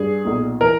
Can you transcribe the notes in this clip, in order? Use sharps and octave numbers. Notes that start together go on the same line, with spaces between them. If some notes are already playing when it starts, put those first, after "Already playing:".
Already playing: G2 G#4
B1 A#2
E3 A#4